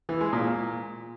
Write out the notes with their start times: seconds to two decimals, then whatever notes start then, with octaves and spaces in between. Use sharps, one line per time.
0.09 E3
0.21 G#3
0.33 A#2